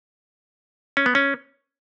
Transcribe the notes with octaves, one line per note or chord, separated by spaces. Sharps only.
C#4
B3
C#4